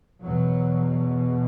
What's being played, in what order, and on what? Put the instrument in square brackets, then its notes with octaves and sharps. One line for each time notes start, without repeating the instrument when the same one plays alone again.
[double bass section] E2 B2 F#3